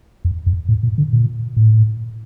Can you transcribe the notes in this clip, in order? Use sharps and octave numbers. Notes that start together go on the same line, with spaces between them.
F2
F2
A2
A#2
D3
A#2
A2